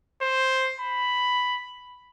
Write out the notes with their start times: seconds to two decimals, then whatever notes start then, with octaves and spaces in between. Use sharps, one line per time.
0.22 C5
0.80 B5